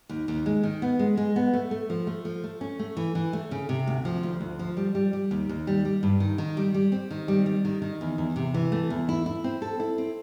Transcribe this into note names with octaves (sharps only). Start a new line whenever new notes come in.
D#2
D#2
G#3
D#3
B3
G#3
G#3
B3
A3
A3
F3
A3
F3
A3
C#4
A3
E3
E3
A3
C#3
C3
D2
F3
D2
D2
F3
G3
G3
G3
D#2
D#2
G3
G3
G2
D#3
D#3
G3
G3
C4
D#3
G3
G3
D#3
D#3
E2
E2
C3
E3
A3
E2
E4
E4
C4
A4
E4
C4